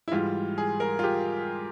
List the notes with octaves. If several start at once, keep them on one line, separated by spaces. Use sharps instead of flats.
E4
G#2 E3 G3 F4
G#4
A#4
F4
G4